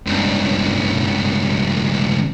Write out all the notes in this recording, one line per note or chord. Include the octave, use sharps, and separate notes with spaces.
C#2 G2